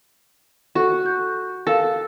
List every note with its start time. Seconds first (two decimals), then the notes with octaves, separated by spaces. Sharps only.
0.75 F#4 A4
1.06 G6
1.67 A4 A#4 F5